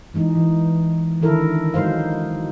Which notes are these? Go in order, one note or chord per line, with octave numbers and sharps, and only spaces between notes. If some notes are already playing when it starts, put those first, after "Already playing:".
E3 G#3 D#4
E3
D3 D#3 E4 A4 A#4
F#3 G#3 D#4 C5 F5